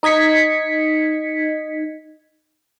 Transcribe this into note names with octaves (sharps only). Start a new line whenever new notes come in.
D#4 D#5 G#6 B6 C#7